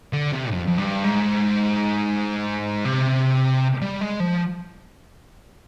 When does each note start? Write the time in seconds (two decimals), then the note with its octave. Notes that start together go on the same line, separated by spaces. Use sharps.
0.13 D3
0.32 C3
0.52 F2
0.68 F2
0.78 G2
1.04 G#2
2.85 C3
3.82 G3
4.01 G#3
4.20 F3